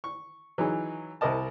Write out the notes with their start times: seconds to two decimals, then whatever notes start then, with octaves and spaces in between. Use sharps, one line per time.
0.04 C#6
0.58 E3 F#3 D#4 G#4
1.21 C2 E4 A#4 D#5 A5